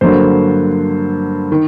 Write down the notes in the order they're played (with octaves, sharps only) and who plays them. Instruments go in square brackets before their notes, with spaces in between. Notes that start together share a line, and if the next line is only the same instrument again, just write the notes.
[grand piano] G2 D3 F#3 A#3 C5
D#3